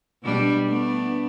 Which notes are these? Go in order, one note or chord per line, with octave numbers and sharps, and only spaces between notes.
B2 G3 D4
A3 B3 D4